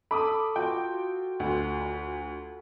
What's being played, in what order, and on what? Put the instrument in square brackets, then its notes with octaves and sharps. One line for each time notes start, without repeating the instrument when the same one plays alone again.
[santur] A4 [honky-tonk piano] B5 D6 D#6
[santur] F4 F#4 D6 [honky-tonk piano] G5
[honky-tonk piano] D2 [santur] F#5 B5
[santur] B5